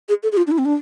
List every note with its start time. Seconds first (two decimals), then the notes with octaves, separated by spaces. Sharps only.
0.09 G#4
0.23 A4
0.32 G#4
0.37 F4
0.47 D4
0.51 E4
0.58 C4
0.65 D4